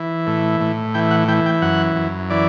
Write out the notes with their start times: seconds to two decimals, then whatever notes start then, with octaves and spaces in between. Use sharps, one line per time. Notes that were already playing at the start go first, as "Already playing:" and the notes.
Already playing: E3
0.27 A2
0.61 A2
0.94 E3 G5
1.11 F#5
1.28 E3 G5
1.46 G5
1.62 F#2 F#5
1.96 F#2
2.30 E3 D5